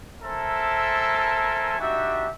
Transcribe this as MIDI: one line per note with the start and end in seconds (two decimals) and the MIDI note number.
0.22 1.79 69
0.22 1.79 70
0.22 1.79 72
0.22 1.79 76
0.22 1.79 80
0.22 1.79 81
1.79 2.26 62
1.79 2.26 63
1.79 2.26 66
1.79 2.26 67
1.79 2.26 76